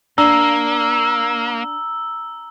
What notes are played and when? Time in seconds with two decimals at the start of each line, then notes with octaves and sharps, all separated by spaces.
0.18 A#3 D4 A#5 E6